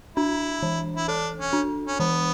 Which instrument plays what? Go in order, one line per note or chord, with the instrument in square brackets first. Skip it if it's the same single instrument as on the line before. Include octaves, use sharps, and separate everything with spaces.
[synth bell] D4 [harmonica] E4
[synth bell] E3
[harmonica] E4
[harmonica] D4 [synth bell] A4
[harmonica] C#4
[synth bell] D4
[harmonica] C#4
[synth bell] E3 [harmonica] B3